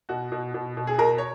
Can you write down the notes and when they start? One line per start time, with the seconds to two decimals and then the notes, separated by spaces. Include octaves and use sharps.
0.09 B2 F#4
0.32 B2
0.54 B2
0.77 B2
0.87 G#4
0.98 B2 A#4
1.18 C#5